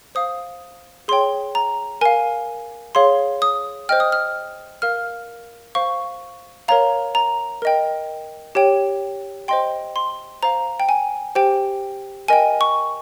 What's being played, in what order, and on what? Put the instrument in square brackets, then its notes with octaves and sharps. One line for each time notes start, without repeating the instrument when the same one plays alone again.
[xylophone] C5 F5 D#6
G#4 C#5 G5 C6
A#5
A#4 F5 G#5
G#4 C#5 F5 C6
D#6
C5 D#5 G5 F6
D#6
F6
A#4 F5 F6
C5 F5 C#6
A#4 C#5 F5 A#5
A#5
A#4 D#5 G5
G4 C#5 G5
C5 D#5 G5 C6
C6
C5 F5 A#5
G5
G#5
G4 C5 G5
A#4 D#5 G5 G#5
C#6